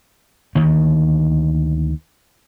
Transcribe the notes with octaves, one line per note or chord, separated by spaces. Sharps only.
D2 D#3 A#3